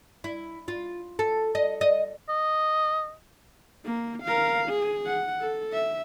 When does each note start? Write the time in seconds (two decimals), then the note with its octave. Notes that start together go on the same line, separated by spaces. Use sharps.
0.24 E4
0.68 F4
1.19 A4
1.55 D#5
1.81 D#5
2.29 D#5
3.85 A#3
4.24 A#4 F5
4.69 G#4
5.06 F#5
5.40 A4
5.73 E5